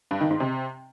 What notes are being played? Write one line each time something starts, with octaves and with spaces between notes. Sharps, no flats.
G2
D#3
G#2
C3